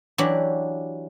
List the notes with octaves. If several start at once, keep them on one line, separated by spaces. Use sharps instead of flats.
E3 F#3 D4 G4